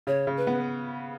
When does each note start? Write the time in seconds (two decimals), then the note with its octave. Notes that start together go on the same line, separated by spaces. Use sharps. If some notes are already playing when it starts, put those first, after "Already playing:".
0.07 C#3 C#5
0.27 C#3
0.37 B4
0.47 B3